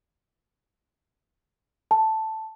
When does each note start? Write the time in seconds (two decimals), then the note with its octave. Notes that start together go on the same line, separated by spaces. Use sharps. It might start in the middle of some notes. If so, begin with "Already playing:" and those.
1.91 A5